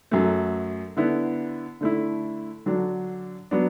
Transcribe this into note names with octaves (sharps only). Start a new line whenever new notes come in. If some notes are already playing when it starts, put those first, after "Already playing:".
F#2 F#3 A3
D3 B3 E4
D3 A3 E4
D3 F#3 D4 F#4
F#3 B3 D4